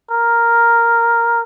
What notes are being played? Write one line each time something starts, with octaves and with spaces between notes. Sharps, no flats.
A#4